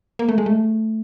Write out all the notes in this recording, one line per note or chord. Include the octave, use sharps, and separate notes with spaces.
A#3
A3
G#3
A3